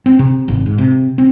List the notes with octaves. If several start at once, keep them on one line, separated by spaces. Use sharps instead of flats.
C4
C3
G#1
G#2
C3
C4